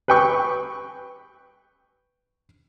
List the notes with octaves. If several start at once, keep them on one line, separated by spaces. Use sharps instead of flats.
B4 G5 C#6